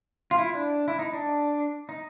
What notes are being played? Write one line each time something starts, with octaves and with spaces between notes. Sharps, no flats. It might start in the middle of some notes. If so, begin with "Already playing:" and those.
F4
E4
D4
E4
D#4
D4
D#4